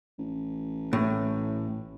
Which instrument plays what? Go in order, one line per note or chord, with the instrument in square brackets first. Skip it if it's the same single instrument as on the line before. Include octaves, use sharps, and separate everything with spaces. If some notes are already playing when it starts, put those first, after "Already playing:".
[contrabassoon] A1
[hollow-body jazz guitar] A2